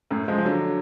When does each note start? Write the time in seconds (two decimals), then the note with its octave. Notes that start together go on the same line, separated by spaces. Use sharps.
0.11 F#2 A2
0.28 F3 G#3
0.38 F3
0.45 D3 F#3